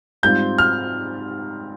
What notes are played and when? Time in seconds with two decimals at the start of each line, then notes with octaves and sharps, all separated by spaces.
0.23 G#2 G3 C4 F4 G6
0.58 F6